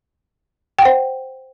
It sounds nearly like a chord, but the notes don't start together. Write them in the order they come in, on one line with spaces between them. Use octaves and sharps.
G5 F#5 C5